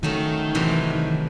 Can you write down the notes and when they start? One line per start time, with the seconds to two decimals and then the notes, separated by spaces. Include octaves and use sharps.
0.03 D#3 F#3 A3 C#4
0.55 C3 E3 F#3